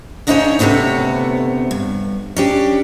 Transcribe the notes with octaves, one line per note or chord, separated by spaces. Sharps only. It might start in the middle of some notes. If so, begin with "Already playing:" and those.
E2 C#3 D4 D#4 F4 C#5
D2 C3 D#3 A3 B3 C#5
G2
C#4 D4 G4